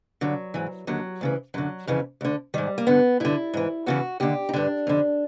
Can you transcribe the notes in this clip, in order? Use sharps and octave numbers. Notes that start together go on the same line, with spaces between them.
G2 D3 F#3
G#2 E3
D#2 D3 F#3
D2 C#3 E3
F#2 D3 F#3
F2 C#3 E3
D2 D3
G#2 D#3 G3
A#3
G2 D3 B3
G2 D3 E4
G#2 E3
E2 C#3 E3 F#4
D#2 D3 G4
D#4
G2 D3 D4
F2 D3